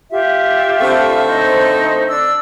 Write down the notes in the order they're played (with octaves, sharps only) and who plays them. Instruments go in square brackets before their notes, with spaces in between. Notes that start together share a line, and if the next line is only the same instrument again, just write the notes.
[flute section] F4 G4 E5
[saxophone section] D3 A3 C4
[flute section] D#4 C5
D4 D5 E6